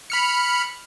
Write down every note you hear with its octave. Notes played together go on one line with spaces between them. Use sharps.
B5 F6 C#7